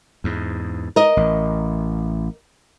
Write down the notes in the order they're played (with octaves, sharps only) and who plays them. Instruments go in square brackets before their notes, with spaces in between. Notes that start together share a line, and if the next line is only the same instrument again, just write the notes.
[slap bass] E2 G#2
[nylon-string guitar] A#4 D#5
[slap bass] A1